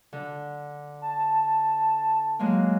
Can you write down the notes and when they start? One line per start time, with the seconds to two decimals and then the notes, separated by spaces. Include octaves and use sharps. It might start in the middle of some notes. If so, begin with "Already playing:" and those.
0.13 D3
1.02 A5
2.39 F#3 G#3 A#3